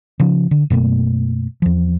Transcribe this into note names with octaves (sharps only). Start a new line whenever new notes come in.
C#3 F3
D3
F#2 B2 A3 A#3
E2 F3